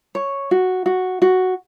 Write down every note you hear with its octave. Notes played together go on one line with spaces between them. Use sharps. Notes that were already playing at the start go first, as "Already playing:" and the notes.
C#5
F#4
F#4
F#4